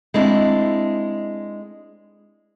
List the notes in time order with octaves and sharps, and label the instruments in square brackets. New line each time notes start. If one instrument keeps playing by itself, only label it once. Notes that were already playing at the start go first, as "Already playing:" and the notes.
[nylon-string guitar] G#3 C4 D4 E4